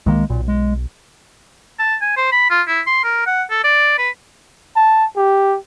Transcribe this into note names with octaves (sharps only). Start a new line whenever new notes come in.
C2 D#3 G#3 A#3
B1 A#2
G#3
A5
G#5
C5
B5
F4
E4
C6
A#4
F#5
A4
D5
B4
A5
G4